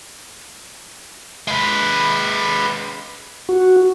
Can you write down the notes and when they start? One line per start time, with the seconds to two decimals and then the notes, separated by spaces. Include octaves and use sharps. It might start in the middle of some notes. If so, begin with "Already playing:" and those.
1.48 G#3 B4
3.49 F#4